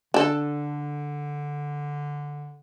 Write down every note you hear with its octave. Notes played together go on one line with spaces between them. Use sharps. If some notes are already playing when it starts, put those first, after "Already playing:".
D3 D4 A4